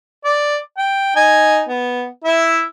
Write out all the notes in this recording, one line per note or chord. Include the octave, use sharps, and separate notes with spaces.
D5
G5
D#4 G#5
B3
E4 E5